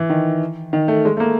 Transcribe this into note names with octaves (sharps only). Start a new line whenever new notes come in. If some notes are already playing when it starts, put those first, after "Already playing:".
Already playing: E3
D#3
D#3
A3
G#3
A3
A#3